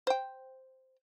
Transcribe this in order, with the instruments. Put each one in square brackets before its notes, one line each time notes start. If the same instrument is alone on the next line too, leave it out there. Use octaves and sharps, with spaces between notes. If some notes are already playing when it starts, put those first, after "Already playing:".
[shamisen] C5 G5